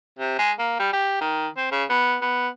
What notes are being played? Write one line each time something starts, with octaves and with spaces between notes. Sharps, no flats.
C3
G#3
A#3
G3
G4
D#3
C4
C#3
B3
B3